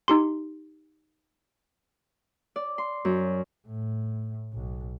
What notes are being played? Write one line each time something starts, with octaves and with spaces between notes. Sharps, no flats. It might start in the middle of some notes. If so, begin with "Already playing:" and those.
D#4 G4 C6
D5
C6
F#2
A2
B1